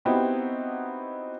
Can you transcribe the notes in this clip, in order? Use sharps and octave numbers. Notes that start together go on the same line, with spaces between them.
B3 C4 D#4 E4 F#4 G4